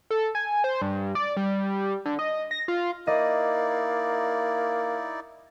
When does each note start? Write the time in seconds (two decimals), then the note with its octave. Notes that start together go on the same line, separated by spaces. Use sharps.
0.11 A4
0.35 G#5
0.64 C5
0.82 G2
1.15 D5
1.37 G3
2.06 D3
2.19 D#5
2.51 A#6
2.68 F4
3.07 A#3 D#4 E4 D5 D#5